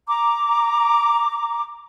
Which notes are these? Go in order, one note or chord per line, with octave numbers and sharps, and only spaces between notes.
A#5 D6